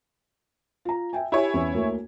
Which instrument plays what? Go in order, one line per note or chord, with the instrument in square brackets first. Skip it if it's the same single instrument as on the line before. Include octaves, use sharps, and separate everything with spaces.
[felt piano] F4 A#5
E5 G5 G#5
[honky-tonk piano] E4 C#5 G#5 [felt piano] G4
[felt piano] E2 C#4
D2 A#3